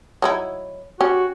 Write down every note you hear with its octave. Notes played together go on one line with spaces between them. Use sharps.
F#3 D#4 E4
C#4 F#4 G4